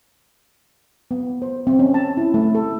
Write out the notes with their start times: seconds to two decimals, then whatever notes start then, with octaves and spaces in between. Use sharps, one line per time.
1.11 B3
1.42 C5
1.67 C4
1.79 C#4
1.94 A5
2.17 E4
2.34 A3
2.55 A4